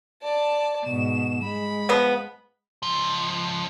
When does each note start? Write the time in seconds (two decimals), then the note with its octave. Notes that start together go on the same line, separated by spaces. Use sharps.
0.23 D5 A5
0.85 G#2 B2 E7
1.43 G#3 B5
1.89 F3 B3
2.83 C#2 F3